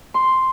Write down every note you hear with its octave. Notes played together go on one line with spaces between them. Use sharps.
C6